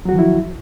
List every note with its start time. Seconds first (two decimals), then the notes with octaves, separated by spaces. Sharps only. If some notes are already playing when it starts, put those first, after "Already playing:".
0.05 F#3
0.09 F#4
0.12 D#3
0.15 F3
0.19 E4